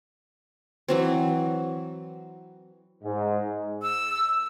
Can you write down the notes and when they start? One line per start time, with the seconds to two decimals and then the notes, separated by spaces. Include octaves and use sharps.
0.88 E3 F#3 C4
3.03 G#2
3.82 E6